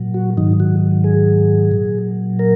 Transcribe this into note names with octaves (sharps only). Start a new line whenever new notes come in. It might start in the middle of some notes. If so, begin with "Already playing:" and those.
Already playing: A#2 F#3
F#4
G#2 D#3 F#3 D#4
F#4
G#4
A#2 F#3
A#4